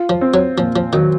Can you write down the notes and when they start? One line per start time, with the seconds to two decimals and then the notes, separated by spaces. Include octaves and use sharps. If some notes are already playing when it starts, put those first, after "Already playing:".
Already playing: F4
0.09 F3
0.21 C4
0.34 F#3
0.57 A#2 F3
0.76 F3
0.93 D#3 F#3